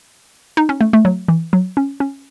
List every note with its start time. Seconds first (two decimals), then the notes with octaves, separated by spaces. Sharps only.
0.57 D#4
0.69 C#4
0.81 A3
0.93 A3
1.05 F#3
1.28 E3
1.53 F#3
1.77 C#4
2.00 C#4